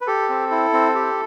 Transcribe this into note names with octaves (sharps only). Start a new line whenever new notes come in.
B4
G4 A4
C4
E4
C4
G4